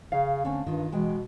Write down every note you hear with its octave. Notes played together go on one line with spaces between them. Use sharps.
C#3 F5
D3 A3 C4 C#4
G2 D#3 F4
B2 E3 G#3 G5